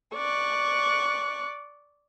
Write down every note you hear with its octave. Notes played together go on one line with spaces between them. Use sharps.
D5 C#6 F#6